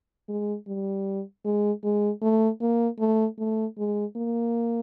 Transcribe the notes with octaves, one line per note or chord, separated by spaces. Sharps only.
G#3
G3
G#3
G#3
A3
A#3
A3
A3
G#3
A#3